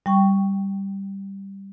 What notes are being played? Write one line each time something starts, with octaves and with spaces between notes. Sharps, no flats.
G3 G5 C#6